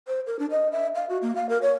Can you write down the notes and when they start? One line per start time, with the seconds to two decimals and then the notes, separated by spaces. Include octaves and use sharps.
0.07 C5
0.27 A#4
0.39 D4
0.51 D#5
0.72 E5
0.95 F5
1.10 F#4
1.22 A#3
1.36 F5
1.49 A#4
1.62 C#5